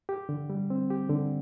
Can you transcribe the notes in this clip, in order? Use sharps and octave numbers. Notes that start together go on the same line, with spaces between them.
G4
D3
G3
C4
G4
D3